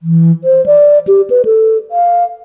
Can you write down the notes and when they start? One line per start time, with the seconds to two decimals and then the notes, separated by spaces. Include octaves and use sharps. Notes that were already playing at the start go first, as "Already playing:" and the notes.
0.03 E3
0.44 C5
0.66 D5
1.08 G4
1.30 B4
1.45 A4
1.91 F5